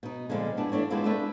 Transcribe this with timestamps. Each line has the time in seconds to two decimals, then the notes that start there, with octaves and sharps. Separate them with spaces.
0.03 B2 D#4
0.30 A#2 D3 F3 G3 G#3
0.57 F2 B3 D4 E4
0.72 E3 A3 D4 C#5
0.90 G#3 B3 C4 D4 E4 F4
1.05 A3 D4 B4 E5